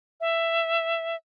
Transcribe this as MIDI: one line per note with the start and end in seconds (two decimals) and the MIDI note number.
0.21 1.16 76